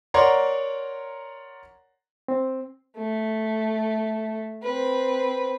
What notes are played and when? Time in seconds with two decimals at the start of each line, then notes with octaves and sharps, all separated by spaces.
0.14 A#4 C#5 D5 F#5 A#5 C6
2.28 C4
2.97 A3
4.62 C4 B4